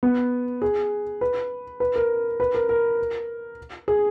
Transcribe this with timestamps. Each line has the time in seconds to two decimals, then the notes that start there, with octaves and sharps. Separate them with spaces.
0.03 B3
0.62 G#4
1.21 B4
1.80 B4
1.96 A#4
2.40 B4
2.55 A#4
2.69 A#4
3.88 G#4